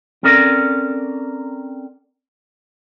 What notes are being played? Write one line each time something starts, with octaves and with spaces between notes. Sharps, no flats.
C4 C#4 A4 A#4 D5